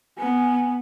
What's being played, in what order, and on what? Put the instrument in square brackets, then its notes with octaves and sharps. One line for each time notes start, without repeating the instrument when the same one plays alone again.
[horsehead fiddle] B3 [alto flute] G#5